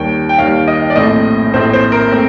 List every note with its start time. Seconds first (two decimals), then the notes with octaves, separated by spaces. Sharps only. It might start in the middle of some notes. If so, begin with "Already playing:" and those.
Already playing: D#2 D#3 G3 G5
0.29 G5
0.38 D#2 D#3 G3 F5
0.68 D#5
0.90 D5
0.96 A#1 A2 A3 C4 D#5
1.54 A#1 A2 A3 C4 C5
1.73 C5
1.92 A#4
2.12 A3 C4